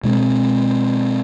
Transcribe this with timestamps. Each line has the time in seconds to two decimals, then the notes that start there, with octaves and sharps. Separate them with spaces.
0.04 B2 G#3 B3 C4